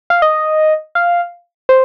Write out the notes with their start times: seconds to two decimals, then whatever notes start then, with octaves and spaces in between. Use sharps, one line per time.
0.10 F5
0.22 D#5
0.95 F5
1.69 C5